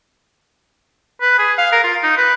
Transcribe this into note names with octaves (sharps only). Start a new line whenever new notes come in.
B4
G#4
F5
A#4
F4
D#4
B4